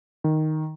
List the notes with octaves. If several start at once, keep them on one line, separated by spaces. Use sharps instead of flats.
D#3